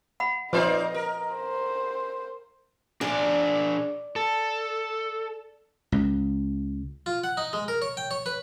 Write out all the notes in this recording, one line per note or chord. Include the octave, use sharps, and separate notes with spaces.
F#5 B5
F3 D#4 B4 C5 D5 D#5
A#4
C5
D4 G#4 D5
A4
C#2
F4
F#5
D#4
G#3
A#4
C#5
G5
C#5
B4